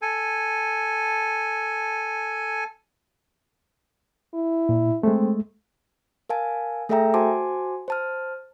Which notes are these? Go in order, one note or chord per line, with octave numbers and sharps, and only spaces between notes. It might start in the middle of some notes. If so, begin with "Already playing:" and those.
A4 G#5
E4
A#2
G#3 A3 C4
A#4 F5 G#5 A5
A3 G#4 A4 E5 G5 A#5
F#4 C5 G#5 A5 C6 D6
C5 A5 F6